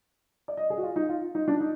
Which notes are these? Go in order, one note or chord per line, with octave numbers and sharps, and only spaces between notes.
D5
D#5
G#4
F#4
F4
D#4
F4
D#4
D4
D#4